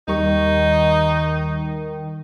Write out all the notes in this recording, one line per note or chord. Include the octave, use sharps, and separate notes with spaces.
D#2 D#3 G3 D#4 C#6